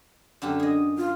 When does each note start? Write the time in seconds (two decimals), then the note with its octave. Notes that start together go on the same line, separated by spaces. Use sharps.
0.42 F#2 D3 G4
0.60 G#4 D#5
0.97 F4